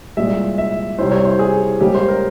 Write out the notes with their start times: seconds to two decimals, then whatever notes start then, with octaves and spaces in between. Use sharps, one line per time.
0.17 C2 A#2 G#3 E5
0.58 E5
0.99 C2 C3 G3 C#4 E4 C5
1.12 C#5
1.25 C5
1.39 G#4
1.80 C#2 C#3 G3 A#3 G4
1.95 C5
2.08 A#4